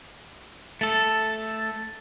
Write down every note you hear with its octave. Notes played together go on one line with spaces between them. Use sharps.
A3 A4